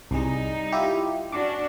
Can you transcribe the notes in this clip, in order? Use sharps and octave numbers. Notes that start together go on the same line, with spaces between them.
C2 G3 D#4 G#4
E4 F4 G4
C#4 D4 F#4 D6